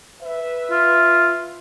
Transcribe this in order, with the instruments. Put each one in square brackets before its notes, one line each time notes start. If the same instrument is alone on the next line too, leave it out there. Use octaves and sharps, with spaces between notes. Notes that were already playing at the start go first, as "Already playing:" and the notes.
[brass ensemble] B4 E5
[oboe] F4